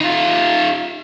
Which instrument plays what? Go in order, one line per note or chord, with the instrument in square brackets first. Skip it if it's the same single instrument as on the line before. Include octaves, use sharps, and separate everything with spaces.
[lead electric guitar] D#4 F4